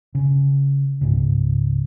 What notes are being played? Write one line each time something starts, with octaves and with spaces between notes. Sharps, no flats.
C#3
C#2 G#2 C#3